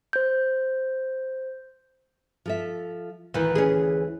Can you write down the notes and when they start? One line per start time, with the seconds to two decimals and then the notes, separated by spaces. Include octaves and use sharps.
0.13 C5 G6
2.46 F3 A4 E5
3.34 D2 D#3 E3 B4
3.55 C#4 G#4